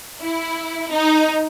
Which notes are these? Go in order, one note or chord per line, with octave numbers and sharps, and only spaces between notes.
E4
D#4